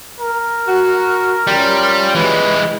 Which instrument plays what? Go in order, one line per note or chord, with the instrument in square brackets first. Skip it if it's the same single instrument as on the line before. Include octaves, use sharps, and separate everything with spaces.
[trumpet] A#4
[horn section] F#4
[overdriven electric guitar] G3 [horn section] C#4 F4 G4
[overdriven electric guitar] E3 G#3 [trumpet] B4